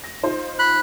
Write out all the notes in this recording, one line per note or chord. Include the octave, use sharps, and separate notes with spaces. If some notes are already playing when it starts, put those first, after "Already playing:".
A#6
D#4 F4 C5
B5 F#6